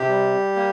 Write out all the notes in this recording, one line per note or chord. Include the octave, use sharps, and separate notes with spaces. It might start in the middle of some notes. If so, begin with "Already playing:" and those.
Already playing: C3 G4
G3
A#3